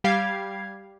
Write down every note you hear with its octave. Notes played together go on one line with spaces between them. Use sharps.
G3 G4 F5 G#6 C7